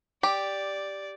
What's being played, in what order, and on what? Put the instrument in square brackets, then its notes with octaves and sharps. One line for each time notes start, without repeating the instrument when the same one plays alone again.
[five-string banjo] G4 [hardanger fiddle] D5